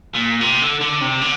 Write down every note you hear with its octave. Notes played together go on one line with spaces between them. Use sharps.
A#2
C3
D3
D3
C3
D3